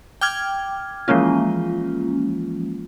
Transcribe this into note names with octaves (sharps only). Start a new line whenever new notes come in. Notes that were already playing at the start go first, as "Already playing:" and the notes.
G5 D6 F6 G#6
E3 F3 G#3 A#3 C#4 F4